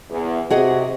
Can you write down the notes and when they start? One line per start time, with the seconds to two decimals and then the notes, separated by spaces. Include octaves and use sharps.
0.10 E2
0.50 C3 F#4 G#4 D#5